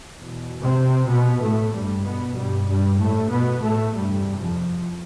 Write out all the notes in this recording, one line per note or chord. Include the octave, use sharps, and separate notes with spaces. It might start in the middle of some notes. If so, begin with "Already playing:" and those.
E2 B2
C3 C4
B2 B3
A2 A3
G2 G3
G2 B2 B3
G2 G3
G2 G3
A2 A3
B2 B3
A2 A3
E2 G2 C3 G3
F2 F3